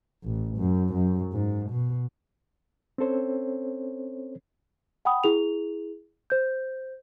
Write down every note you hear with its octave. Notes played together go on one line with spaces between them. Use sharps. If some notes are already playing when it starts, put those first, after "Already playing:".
A1
F#2
F#2
G#2
B2
C4 C#4 A4 C5 C#5
F#5 G5 B5 D#6
E4 G#4 F7
C5 G6